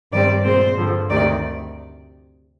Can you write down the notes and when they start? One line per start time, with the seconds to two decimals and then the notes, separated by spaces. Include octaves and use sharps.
0.12 G2 D#3 G3 C4 D5
0.44 A#2 G#3 C4 C5
0.77 G2 D3 F3
1.10 D2 C3 D#3 D5